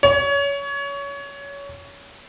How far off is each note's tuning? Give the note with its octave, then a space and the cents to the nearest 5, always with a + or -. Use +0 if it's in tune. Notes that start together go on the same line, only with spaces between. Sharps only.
C#5 +25